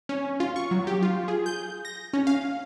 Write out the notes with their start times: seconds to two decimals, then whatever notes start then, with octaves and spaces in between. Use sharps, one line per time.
0.09 C#4
0.40 F4
0.56 C#6
0.71 F#3
0.87 G4
1.02 F4
1.28 G#4
1.46 G6
1.85 A#6
2.13 C#4
2.27 F5